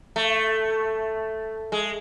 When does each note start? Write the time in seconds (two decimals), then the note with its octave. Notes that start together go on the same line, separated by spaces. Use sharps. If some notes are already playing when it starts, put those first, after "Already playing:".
0.16 A3
1.72 G#3